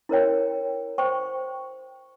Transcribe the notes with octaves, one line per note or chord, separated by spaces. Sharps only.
E4 A#4 C#5 G5
C5 G5 C#6